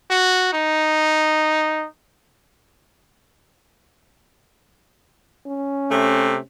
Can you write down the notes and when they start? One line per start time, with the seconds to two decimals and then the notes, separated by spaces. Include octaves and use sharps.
0.10 F#4
0.53 D#4
5.46 C#4
5.90 C3 A3